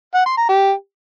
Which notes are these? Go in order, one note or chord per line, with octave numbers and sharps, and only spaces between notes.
F#5
C6
A#5
G4